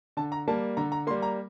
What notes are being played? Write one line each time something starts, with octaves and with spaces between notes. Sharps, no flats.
D3 A5
A#5
G3 A#3 A5
D3 A#5
A#5
G3 A#3 C6
A#5